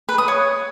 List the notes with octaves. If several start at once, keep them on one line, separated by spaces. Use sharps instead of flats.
B4
D#6
C#5